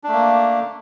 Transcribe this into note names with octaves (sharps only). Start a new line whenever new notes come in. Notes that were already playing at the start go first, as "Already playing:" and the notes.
A3 A#3 D4